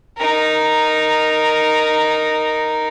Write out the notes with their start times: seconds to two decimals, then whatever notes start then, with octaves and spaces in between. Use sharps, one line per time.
0.17 D#4 A#4